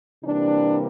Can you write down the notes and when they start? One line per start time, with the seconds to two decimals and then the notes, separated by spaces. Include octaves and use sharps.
0.24 C3 E3 G3 A#3 D4